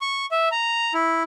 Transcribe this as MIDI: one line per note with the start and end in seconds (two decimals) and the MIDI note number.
0.01 0.26 85
0.31 0.49 76
0.52 0.93 82
0.94 1.23 64